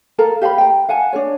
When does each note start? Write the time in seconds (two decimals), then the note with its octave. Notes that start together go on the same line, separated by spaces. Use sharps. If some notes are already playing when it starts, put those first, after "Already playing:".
0.18 A4 A#4 F5 A#5
0.42 G4 F5 A5 B5
0.58 G5 A#5
0.89 F5 F#5 G#5 A5
1.13 D4 A#4 C#5